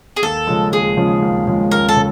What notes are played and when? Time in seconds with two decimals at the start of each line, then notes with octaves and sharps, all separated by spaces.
0.16 G#4
0.22 D#2 A4
0.47 C#3 F3 G#3
0.72 D#2 G#4
0.97 C#3 F3 G#3
1.22 D#2
1.47 C#3 F3 G#3
1.71 D#2 A#4
1.89 A4
1.96 C#3